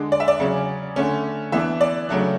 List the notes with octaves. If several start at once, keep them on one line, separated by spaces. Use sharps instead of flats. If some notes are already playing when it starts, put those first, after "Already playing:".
Already playing: D3 G#3 D4
D5
E5
D5
C#3 F#3 C#4
D3 A3 C#4
E3 B3 D4 E5
D5
C#3 F#3 A3 D4